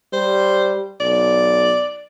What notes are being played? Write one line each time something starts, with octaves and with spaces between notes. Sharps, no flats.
G3 C5
B1 D5